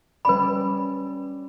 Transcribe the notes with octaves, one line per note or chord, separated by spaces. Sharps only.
G3 C#4 B4 D5 B5